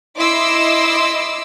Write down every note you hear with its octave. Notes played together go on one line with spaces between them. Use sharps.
E4 D#5 C6 D6 E6